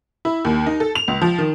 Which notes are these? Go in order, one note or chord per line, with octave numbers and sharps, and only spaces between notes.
E4
D#2
D#4
A4
F7
C#2
F3
D#3